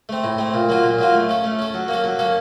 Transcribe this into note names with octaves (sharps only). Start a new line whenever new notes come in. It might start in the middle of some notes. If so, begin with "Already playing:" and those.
A3 C4
A2
A3 C4
A#2
F#3 A#3 F4
A#2
F#3 A#3 F4
A3
C#4 A4
A3
C#4 A4
F#3
A#3 C#4 A4
F#3
A#3 C#4 A4